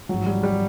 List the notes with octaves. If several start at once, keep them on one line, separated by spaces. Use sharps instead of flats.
G#1 G#2 F3 F#3
G3
G3